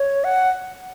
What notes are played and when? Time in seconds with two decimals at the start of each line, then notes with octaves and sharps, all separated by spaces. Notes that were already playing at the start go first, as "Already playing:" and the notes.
Already playing: C#5
0.24 F#5